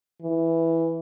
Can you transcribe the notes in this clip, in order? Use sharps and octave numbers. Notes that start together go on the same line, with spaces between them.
E3